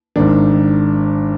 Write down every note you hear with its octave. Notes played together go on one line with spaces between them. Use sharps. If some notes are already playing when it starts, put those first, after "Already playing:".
G#1 G#2 D#3 D4
D#3